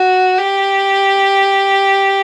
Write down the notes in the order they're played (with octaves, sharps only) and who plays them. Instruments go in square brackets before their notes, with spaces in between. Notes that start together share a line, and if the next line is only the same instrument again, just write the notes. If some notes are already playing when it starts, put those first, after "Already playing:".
Already playing: [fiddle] F#4
G4